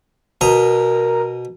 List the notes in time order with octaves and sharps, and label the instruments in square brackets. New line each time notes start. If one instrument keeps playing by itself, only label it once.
[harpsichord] B2 D#5 A#5 [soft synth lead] A#4